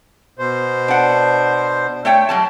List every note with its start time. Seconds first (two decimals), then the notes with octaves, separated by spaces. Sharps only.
0.38 B2 C5
0.88 D4 F#5
2.05 A3 C#5 G5
2.29 F#3 G3 A5